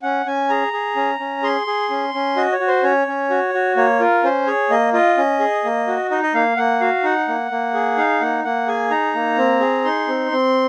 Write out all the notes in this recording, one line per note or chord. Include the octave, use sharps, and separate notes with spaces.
C#4 F#5
C#4 G#5
G#4 A#5
G#4
C#4
C#4
G#4 C6
G#4
C#4
C#4
F#4 D#5
C#5
F#4
C5
C#4 C#5
C#4
F#4
F#4
A#3 C#5
F4 A#4
C#4 C5
G#4 C#5
A#3 D#5
F4 D#5
C#4
G#4
A#3
F#4
D#4 D#5
D#5
A#3 F5
A#3 F#5
F#4 F5
D#4 F#5
A#3
A#3
G#4
D#4 F5
A#3 F#5
A#3 F#5
G#4 G#5
D#4 A#5
A#3
C4
G#4
D#4 C6
C4
C4